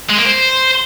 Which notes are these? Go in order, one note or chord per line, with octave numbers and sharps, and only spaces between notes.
G#3
A#3
C5